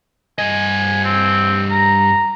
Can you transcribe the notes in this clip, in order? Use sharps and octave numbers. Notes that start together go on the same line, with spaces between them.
G2 D#5 G#5
C4
A#5